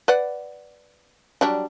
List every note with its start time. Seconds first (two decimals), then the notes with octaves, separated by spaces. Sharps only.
0.08 B4 D5 F#5
1.41 F#3 G3 D4